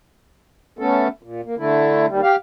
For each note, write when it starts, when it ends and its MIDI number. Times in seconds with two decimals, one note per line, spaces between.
0.79 1.08 57
0.79 1.08 59
0.79 1.08 61
0.79 1.08 69
1.23 1.41 46
1.45 1.55 58
1.57 2.06 50
1.57 2.06 57
1.57 2.06 64
2.08 2.21 39
2.08 2.21 55
2.23 2.36 67
2.23 2.36 77